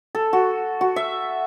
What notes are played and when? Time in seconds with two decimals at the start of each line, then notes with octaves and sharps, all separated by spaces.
0.15 A4
0.33 F#4
0.81 F#4
0.96 E5